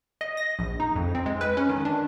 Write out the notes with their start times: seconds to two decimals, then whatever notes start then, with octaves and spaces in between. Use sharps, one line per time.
0.21 D#5
0.37 A#6
0.59 A#1
0.80 D#4
0.96 F2
1.15 C4
1.26 G#3
1.41 B4
1.57 C#4
1.69 D#3
1.85 D4